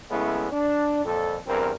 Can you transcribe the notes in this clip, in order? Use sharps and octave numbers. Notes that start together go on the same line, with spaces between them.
C#3 G#3 A3 B3 C#4 E4
D4
F2 A#2 A4
E2 G2 C4 A#4